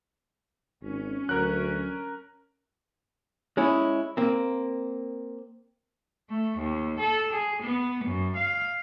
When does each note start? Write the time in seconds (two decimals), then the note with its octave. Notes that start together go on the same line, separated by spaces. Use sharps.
0.82 G#1 C#4
1.29 D2 F#3 A#4 F#6
3.57 G#3 C#4 E4
4.17 A#3 C4
6.29 A3
6.58 D#2
6.99 A4
7.32 G#4
7.62 B3
8.04 F#2
8.36 F5